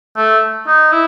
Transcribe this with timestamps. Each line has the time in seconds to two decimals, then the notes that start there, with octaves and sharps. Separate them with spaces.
0.16 A3
0.67 D#4
0.92 E4